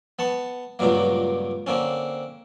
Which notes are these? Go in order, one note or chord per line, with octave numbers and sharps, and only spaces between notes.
B3 A5 C#6
C#2 G2 A#2 F#3 A#3
D3 A#3 C4 C#4